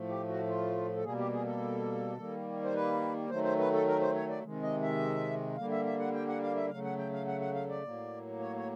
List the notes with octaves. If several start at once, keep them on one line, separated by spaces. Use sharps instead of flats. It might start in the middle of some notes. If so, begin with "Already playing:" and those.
Already playing: A2 F3 A3
G4
F#4
F4
A4
B2 G3 A#3 G#4
G4
G#4
A4
D#3 G3 A#3
C5
B4
D#3 F#3 A3 C5
C5
B4
A4
A#4
C5
C#5
D5
C3 D#3 G#3
D#5
E5
D3 G3 A#3 F5
E5
E5
F#5
G5
F#5
F5
E5
C#3 F#3 A3 F5
F#5
G5
F5
F#5
F#5
F5
D5
A2 F#3 A#3
C#5
C#5